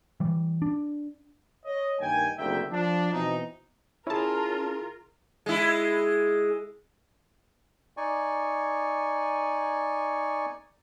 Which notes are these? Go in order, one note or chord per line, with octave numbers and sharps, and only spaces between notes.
E3 G3
D4
C#5 D#5
G2 D#3 A#3 G5 G#5
F#1 D2 C3 A#3 E5 G5
F3 D4
B2 E3 C4 D#4
C#4 E4 F4 G#4 A#4 A5
G#3 E4
D#4 D5 G#5 C#6